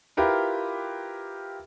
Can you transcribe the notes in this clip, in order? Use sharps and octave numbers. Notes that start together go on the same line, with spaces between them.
E4 F4 G4 A#4 B4